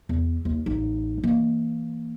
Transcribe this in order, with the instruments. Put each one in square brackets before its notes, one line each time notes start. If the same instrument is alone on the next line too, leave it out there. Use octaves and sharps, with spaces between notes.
[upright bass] E2
D#2
A1 D#4
E3 A#3